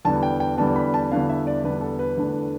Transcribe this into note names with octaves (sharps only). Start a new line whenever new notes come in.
E2 D3 G3 B3 A5
G5
G5
E2 D3 G3 B3 A5
B5
A5
E2 D3 G3 B3 F5
E5
D5
E2 D3 G3 B3 B4
A4
B4
E2 D3 A3 D4